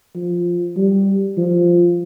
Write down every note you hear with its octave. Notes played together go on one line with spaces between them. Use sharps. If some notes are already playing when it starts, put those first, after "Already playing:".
F3
G3
F3